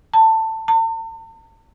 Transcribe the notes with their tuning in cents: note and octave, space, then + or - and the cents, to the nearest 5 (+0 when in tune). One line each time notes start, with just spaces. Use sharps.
A5 +20
A5 +45